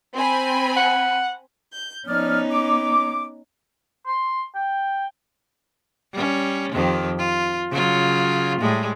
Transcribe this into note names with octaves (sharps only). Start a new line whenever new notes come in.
C4 G#5 B5
F#5
G6
F3 B3 C#4 D#4 D5 F6
D6
C6
G5
G3 C#4
F2 D#3 G4
F4
C#3 F#3 F4
A2 G3 G#3